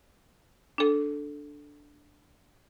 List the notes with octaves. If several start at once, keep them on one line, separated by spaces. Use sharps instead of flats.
D4 A4